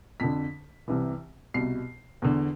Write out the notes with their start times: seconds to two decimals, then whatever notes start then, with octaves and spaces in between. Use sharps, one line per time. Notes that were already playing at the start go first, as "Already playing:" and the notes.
0.20 F2 D3 B6
0.88 C2 C3 E3
1.54 C2 B2 C7
2.22 E2 D3